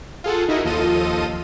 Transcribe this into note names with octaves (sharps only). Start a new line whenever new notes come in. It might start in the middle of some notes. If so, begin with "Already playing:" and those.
F4 G#4 A4 F#5
D#4 E4 F#4 A#4 D#5
D#2 F3 F4 A4 D#5 D#7